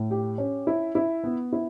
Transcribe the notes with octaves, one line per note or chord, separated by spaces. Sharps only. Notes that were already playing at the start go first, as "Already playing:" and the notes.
Already playing: A2
G4
C#4
E4
E4
B3
E4